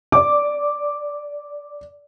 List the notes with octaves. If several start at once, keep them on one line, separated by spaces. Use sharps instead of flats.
D5 D6